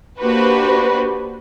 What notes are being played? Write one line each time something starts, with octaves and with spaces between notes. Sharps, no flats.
A#3 D4 F#4 G4 B4 C5